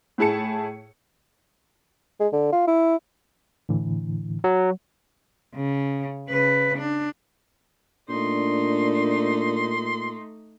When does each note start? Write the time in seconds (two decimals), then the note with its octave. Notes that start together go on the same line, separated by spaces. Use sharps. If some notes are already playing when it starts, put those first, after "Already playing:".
0.18 A2 E4 G#4 A5 C#7
2.20 G#3
2.32 D3
2.52 F4
2.67 E4
3.69 A2 D3 E3
4.44 F#3
5.55 C#3
6.28 C#3 B4
6.78 D4
8.09 A#2 A3 D4 D#4 C6